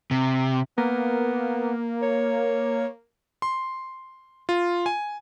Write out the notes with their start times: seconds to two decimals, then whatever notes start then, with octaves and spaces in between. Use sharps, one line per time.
0.11 C3
0.78 A#3 B3
2.02 C#5
3.42 C6
4.49 F4
4.86 G#5